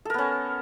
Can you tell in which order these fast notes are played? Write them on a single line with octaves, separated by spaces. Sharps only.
A4 A#4 B3 C#4